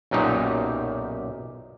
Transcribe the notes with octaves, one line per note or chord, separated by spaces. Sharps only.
B1 F#2 A#2 D#4 G4